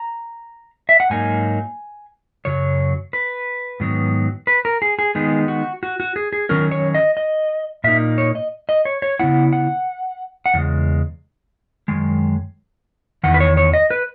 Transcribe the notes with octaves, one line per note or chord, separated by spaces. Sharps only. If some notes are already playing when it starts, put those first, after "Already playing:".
Already playing: A#5
E5
F#5
G#2 F#3 A#3 D#4 G#5
F#2 C#3 F#3 C#5
B4
G#2 D#3 F#3 B3
B4
A#4
G#4
G#4
D#3 G#3 B3 D#4 G#4
F#4
F#4
F#4
G#4
G#4
D#3 F#3 C#4 A#4
C#5
D#5
D#5
A#2 A#3 D#4 E5
C#5
D#5
D#5
C#5
C#5
C#3 G#3 B3 E4 F#5
F#5
F#5
E2 C#3 G#3
F#2 D#3 G#3
E2 D#3 F#5
B4
C#5
C#5
D#5
B4